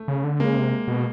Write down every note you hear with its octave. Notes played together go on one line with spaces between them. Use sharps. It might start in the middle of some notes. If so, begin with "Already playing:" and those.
Already playing: A3
C#3
D3
C#3 G#3 A#3
C3
B2